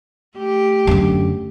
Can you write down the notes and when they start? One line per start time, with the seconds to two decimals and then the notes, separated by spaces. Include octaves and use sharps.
0.37 A3 G4
0.87 F#2 D3